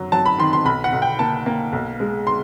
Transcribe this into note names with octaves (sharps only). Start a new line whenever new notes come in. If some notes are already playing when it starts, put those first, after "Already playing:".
Already playing: F#2 F#3
F#3 A5
B5
D#3 C6
C6
B1 B5
F#5
B1
G5
A#3 A5
A#3
B1
G#3
C6